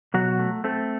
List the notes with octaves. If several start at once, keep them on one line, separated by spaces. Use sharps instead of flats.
B2 F#3 F#4
A3
A3 C4 A4